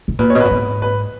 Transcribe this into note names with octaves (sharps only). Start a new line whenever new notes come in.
B2
A#2 B4
B2 C#5
B4
A#2
G#2
B4